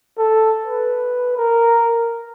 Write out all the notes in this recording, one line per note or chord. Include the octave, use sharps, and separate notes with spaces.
A4
B4
A#4